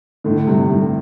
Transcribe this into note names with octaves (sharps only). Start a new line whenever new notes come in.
A2 D3
G2 C3
A2